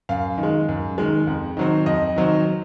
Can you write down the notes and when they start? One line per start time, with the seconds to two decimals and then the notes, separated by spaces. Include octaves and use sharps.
0.09 F#2 F5
0.38 D#3
0.43 G#3
0.69 F#2
0.98 D#3 G#3
1.27 F2
1.57 D#3 F#3 C4
1.86 F2 D#5
2.16 D#3 F#3 C4